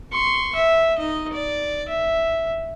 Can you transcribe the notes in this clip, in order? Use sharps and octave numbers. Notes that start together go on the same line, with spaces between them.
C6 C#6
E5
D#4 D#5
D5
E5